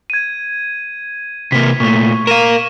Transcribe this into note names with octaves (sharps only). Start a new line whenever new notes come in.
G#6 D#7
C3 A#3 B6
A#2 A3 C#6
A#4 F5 D#7 E7